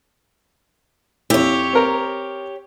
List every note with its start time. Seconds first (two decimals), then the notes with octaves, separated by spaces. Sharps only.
1.30 F2 E4 G4 C#5
1.73 C4 A#4